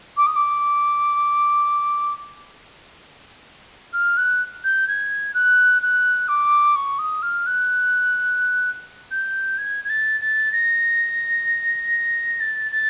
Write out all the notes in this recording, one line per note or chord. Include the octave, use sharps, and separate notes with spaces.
D6
D#6
D6
F6
F#6
G6
G#6
F#6
F#6
D6
C#6
D#6
F6
F#6
G6
G#6
G#6
A6
A6
A#6
A6
A6